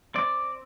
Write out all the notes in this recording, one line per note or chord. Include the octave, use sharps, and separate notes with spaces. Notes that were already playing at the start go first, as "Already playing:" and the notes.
C4 D5